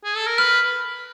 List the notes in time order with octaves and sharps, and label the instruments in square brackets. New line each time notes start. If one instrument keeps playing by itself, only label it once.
[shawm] G#4
A4
A#4
[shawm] B4 [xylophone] F6